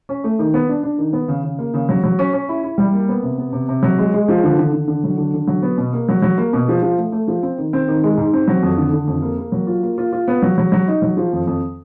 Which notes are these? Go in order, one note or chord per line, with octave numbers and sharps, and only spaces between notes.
C#4
A3
D#3
B3
D4
D4
D#3
B3
C#3
C#3
A#3
C#3
F#3
F#3
C#4
C#4
E4
E4
G3
A#3
B3
C3
B3
C3
C3
F#3
G#3
G#3
F3
D3
D3
D3
D3
F#3
D3
D3
F#3
B3
B2
A#3
F#3
F#3
A#3
B2
F3
F3
A3
A3
F3
C4
D#3
C4
D#3
G#3
G#2
C4
F#3
F2
D3
D3
F2
A#3
A#3
F#3
F4
A#3
F4
F4
B3
F#3
F#3
F#3
D#4
F#3
F3
F2
F2